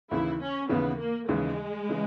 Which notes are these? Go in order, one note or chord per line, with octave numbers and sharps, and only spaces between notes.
D#2 C#3 E3 E4
C#4
D#2 C#3 E3 B3
A#3
D#2 C#3 E3 G#3
C#3 E3